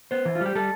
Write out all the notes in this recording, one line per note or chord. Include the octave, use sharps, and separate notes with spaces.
B3 C5
E3
F4
G3 G4
G3 A4